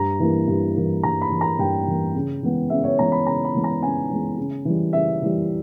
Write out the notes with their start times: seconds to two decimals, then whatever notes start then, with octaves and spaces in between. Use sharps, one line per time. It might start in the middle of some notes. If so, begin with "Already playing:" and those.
Already playing: G2 A#5
0.20 E3 A#3
0.48 G2
0.75 E3 A#3
1.03 G2 A#5
1.21 B5
1.31 E3 A#3
1.41 A#5
1.58 G2 G5
1.87 E3 A#3
2.15 C#3
2.42 E3 G#3 B3
2.70 C#3 E5
2.84 C#5
2.98 E3 G#3 B3 A#5
3.12 B5
3.26 C#3 A#5
3.45 B5
3.55 E3 G#3 B3
3.64 A#5
3.82 C#3 G#5
4.10 E3 G#3 B3
4.38 C#3
4.65 E3 G3
4.93 C#3 E5
5.22 E3 G3